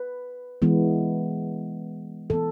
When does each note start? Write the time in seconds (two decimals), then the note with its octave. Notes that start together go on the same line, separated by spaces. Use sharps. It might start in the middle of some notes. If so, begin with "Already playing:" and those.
Already playing: B4
0.62 E3 G#3 B3
2.30 E3 B3 A4